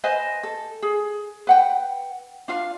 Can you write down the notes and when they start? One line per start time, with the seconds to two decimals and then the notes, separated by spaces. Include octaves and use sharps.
0.04 B4 C5 D#5 G#5
0.43 A4
0.82 G#4
1.47 B4 F#5 G5
2.48 D4 F4 F5